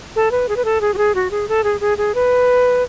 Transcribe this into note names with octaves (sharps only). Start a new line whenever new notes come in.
A4
B4
G#4
B4
A4
G#4
F#4
G#4
F#4
G#4
A4
G#4
G#4
G#4
B4